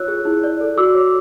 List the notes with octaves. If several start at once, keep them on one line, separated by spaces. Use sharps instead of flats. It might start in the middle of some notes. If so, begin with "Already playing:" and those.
Already playing: F4 C#5 E6 F#6
G#4
E4
D5
A4
F#4 D6 E6
C#5